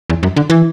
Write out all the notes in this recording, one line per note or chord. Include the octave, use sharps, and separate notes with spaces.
E2
F#2
D3
E3